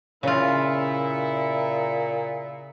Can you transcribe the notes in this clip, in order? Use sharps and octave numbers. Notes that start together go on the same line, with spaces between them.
A#2 C#3 E4 F4 E5